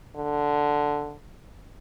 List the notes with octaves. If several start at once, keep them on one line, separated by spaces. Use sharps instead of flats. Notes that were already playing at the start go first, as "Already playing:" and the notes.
D3